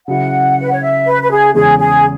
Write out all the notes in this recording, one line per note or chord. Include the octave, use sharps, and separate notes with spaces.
C#3 F#3 E4 F#5
B4
C#5
E5
B4
B4
G#4
E2 C#3 G#3 C#4 G#4
G#4